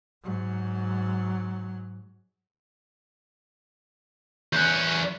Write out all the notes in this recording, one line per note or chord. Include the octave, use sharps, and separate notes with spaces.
G#2 F#3
E2 C#4 F#6 G6